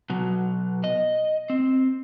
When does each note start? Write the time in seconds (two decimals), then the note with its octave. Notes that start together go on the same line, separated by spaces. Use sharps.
0.10 B2 F#3
0.84 D#5
1.50 C4